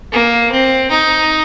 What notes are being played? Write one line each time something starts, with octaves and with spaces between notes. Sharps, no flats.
A#3
C4
D#4